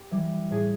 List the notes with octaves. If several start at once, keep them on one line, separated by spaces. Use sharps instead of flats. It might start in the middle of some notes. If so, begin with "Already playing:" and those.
Already playing: G4
E3 G3
A2 G#4